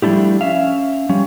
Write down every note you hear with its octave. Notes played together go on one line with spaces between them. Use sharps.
F3 G3 A3 D4 E4 G4
C#4 E5 F5
F3 G3 C#4